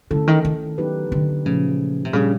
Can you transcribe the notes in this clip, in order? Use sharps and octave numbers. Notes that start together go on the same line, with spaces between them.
D3 A3 C#4 E4 A4
D#3
D#3
F#3 B3 D#4 G4 B4
D3
A#2 C#3 F3 A3
C3
A#2 C#3 G3 A#3 D4 G4